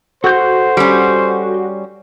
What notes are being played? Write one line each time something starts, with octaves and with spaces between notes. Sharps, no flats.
F#4 A4 C5 F#5 G6
G3 C#4